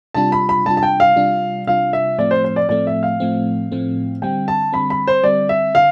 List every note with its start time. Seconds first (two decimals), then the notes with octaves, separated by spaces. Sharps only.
0.14 C3 G3 D4 F4 A5
0.32 B5
0.49 B5
0.65 C3 G3 D4 F4 A5
0.77 A5
0.83 G5
1.00 F5
1.16 C3 G3 D4 F4
1.67 C3 G3 D4 F4 F5
1.93 E5
2.18 A2 F3 A3 C4 D5
2.31 C5
2.44 C5
2.56 D5
2.69 A2 F3 A3 C4 D5
2.87 E5
3.03 F5
3.20 A2 F3 A3 C4
3.71 A2 F3 A3 C4
4.22 D3 G3 C4 G5
4.48 A5
4.72 D3 G3 C4 B5
4.90 B5
5.07 C5
5.24 D3 G3 C4 D5
5.49 E5
5.74 D3 F5